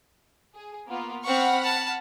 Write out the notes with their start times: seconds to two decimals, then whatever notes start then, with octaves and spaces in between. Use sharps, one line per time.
0.54 G#4
0.87 A#3 B3 F4
1.24 C4 F#5 B5 C#6 F6
1.63 A5